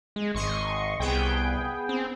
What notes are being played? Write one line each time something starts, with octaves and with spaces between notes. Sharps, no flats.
G#3
G#1 D#5 C6 C#6
C2 B3 G#4 G5
C4